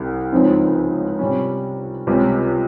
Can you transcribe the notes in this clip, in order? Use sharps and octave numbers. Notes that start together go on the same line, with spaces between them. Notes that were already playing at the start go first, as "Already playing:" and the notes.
Already playing: C2 C3 G3
C#2 C#3 F3 C4 D#4
C3 G3 C#4
C#2 C3 G3 C#4